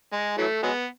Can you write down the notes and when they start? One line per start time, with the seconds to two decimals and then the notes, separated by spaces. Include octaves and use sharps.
0.12 G#3
0.38 E3 F#3 A3
0.63 F#3 G#3 B3